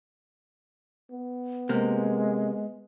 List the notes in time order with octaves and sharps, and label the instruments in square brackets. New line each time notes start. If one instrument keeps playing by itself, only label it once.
[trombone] B3
[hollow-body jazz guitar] C3 A#3 [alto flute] G#3